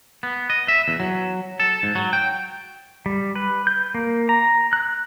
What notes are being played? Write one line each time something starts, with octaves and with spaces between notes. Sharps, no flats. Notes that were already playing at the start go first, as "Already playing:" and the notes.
B3
D#5
E5
E2
F#3
A4
G#2
F#3
G5
G3
B4
G6
A#3
A#5
F#6